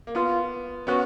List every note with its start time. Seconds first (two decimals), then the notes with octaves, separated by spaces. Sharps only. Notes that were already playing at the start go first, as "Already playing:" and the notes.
0.07 A#3
0.15 B3 F4
0.87 B3 C#4 F#4